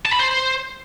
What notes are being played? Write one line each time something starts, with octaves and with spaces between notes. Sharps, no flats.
A5
B5
C5